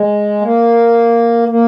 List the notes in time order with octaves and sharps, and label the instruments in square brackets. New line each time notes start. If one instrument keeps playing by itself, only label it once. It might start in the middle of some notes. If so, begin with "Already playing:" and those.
Already playing: [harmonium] G#3
A#3
A#3